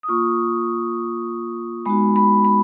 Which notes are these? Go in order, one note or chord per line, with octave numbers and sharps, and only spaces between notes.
D#6
A#3 F4 C#6
G#3 B3 D#4 F#4 B5
B5
B5